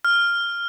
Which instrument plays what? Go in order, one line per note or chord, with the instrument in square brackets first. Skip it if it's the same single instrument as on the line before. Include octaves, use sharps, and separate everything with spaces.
[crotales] F6